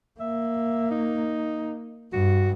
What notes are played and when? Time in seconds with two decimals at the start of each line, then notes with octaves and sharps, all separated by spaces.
0.20 A#3 E5
0.91 D#4
2.13 G2 F#4